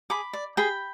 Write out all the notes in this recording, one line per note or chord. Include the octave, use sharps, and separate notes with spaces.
G#4 B5 D6
D5
G#4 G5 B5